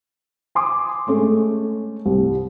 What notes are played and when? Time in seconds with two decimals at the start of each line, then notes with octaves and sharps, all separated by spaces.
0.55 G#5 C6 D6 D#6
1.07 G#3 A3 C#4 A4
2.06 C2